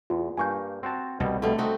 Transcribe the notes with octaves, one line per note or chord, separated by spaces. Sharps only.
E2 F4
G2 A#3 G#5 C#6 G6
C4 F#4 A5
C2 B2 G3
B2 D3 G3 A3
A3 C4 D#4 F#4